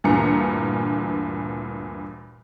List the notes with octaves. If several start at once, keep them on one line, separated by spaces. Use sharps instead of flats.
D2 G2 A#2 E3 A#5 C#7